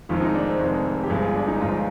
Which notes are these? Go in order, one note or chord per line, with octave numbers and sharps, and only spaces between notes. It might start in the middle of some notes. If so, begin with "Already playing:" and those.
F1 F2 D#3 G#3 F4
D#4
D4
C4
F1 F2 D#3 G#3
G4
G1 G2 F3 G#3 G#4
F4
D4
D#4
G1 G2 F3 G#3 F4